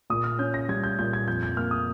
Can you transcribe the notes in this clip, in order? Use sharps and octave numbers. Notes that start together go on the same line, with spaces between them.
A#2 D#6
F6
C#4 G6
A#6
G3 G#6
G6
A#2 G6
G#6
F2 G6
G6
A#3 F6
D#6